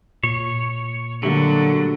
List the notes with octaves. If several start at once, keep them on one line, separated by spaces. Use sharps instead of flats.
A#2 C#5
D3 F#3 G3 A3 A#3